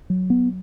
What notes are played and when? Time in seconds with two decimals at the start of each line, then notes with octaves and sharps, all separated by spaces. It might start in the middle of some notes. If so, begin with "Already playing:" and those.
0.10 F#3
0.30 B3